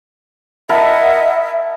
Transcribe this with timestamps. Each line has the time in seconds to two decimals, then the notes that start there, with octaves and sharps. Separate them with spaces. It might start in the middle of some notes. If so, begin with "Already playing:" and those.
0.69 E4 A#4 D#5 E5 F#5 A5